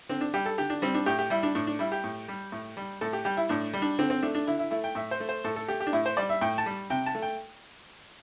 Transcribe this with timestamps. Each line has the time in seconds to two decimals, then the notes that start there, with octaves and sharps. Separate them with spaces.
0.09 D3 C4
0.21 D4
0.34 G3 G4
0.46 A4
0.58 D3 G4
0.70 D4
0.82 G3 C4
0.94 D4
1.06 A2 G4
1.19 G4
1.30 G3 E4
1.43 D4
1.55 A2 D4
1.67 D4
1.79 G3 E4
1.92 G4
2.04 A2
2.28 G3
2.52 A2
2.77 G3
3.01 A2 A4
3.13 G4
3.25 G3 G4
3.37 E4
3.49 A2 D4
3.74 G3
3.82 D4
3.99 D3 C4
4.10 C4
4.22 A3 D4
4.35 D4
4.47 D3 E4
4.59 E4
4.71 A3 E4
4.84 G5
4.95 A2 E5
5.11 C5
5.20 A3
5.29 C5
5.44 A2 A4
5.56 A4
5.68 A3 G4
5.80 G4
5.87 D4
5.93 A2 E4
6.06 C5
6.17 G3 D5
6.29 E5
6.41 A2 G5
6.58 A5
6.66 G3
6.90 C3 G5
7.06 A5
7.15 A3
7.22 G5